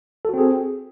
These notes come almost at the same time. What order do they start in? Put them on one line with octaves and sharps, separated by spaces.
A4 F#4 C4 G#4